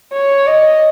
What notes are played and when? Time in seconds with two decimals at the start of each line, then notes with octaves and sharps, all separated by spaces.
0.13 C#5
0.47 D#5